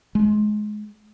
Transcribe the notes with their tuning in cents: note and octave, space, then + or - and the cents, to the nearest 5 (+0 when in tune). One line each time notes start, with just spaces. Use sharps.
G#3 +25